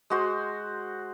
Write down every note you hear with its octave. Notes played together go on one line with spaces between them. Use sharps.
G#3 F#4 C5